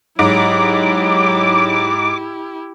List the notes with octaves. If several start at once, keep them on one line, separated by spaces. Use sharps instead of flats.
G#2 F#3 E4 G4 D6